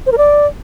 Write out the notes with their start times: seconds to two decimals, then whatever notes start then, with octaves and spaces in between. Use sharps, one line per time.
0.06 C5
0.12 A#4
0.18 D5